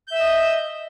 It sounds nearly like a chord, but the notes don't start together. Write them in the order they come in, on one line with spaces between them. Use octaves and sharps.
G6 E5 E6 D#5